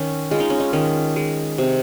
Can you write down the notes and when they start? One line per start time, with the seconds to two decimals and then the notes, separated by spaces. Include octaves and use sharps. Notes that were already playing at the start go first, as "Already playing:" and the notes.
Already playing: D#3 C#4
0.31 G#3 F4
0.40 D#4
0.50 C#4
0.60 D#4
0.73 D#3 C#4
1.16 G#3
1.58 C3